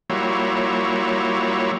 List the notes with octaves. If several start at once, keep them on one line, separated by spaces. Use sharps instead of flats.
F#3 G3 A#3 E4 F4 C#5